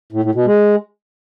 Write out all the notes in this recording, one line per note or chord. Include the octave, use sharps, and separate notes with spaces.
A2
A2
B2
G#3